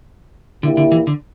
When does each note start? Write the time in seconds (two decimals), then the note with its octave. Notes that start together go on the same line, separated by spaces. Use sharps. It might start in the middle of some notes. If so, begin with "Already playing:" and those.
0.63 A#2 D3 A#3 E4 G4
0.77 D3
0.92 E3
1.07 D3